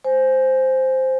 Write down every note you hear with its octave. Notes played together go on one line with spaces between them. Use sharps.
C5 G#5